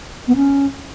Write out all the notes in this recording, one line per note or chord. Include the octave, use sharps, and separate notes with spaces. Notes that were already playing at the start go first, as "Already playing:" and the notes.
B3
C#4